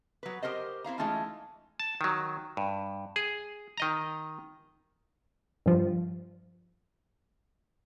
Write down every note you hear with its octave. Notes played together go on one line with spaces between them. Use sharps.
F#3 B4
G4 A4 A#4 C5 D#5
C4 E4 F5 A#5
E3 G#3 A3 C#4 D#4 F4
A5
D#3 F#3
G2
G#4
D#3 D#5 A#5
G2 F3